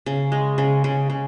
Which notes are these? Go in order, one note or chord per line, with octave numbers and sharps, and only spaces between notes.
C#3
G#3
C#3
C#3
C#3